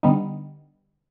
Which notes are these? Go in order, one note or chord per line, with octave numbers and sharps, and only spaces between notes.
D3 G3 B3 D#4